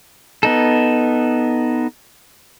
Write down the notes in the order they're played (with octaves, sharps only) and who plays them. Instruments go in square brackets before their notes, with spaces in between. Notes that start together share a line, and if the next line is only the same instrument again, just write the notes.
[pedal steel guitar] B3 D#4 A4